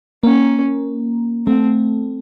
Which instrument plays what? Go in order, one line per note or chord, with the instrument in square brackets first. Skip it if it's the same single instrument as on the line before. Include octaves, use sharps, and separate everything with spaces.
[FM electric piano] A#3 [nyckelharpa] C#4
[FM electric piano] A3 [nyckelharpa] C4